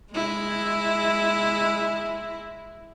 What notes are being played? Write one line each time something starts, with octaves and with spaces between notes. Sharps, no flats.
G#3 E4